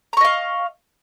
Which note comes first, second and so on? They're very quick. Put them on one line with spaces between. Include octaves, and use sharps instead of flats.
A#5 C#6 D#5 F5